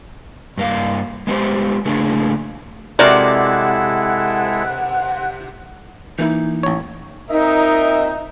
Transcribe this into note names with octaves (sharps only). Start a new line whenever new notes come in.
G2 A#3 F5
G#3 B3 G4 C5
C#3 A3 A#3 D4 G#4
C3 G#3 E4 F#4 A4 A#4 D5 F#5
E3 A#3 D#4 E4
A1 C#5
A#2 C4 D#4 A#4 D#5 E5